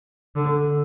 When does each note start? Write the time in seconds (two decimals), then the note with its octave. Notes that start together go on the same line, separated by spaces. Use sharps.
0.36 D3